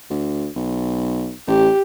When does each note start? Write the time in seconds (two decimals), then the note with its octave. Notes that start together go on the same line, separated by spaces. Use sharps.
0.10 D2
0.56 B1
1.48 A1 G4